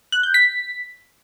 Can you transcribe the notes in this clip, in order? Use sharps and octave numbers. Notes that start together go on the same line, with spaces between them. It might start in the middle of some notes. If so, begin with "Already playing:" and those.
F#6
G6
B6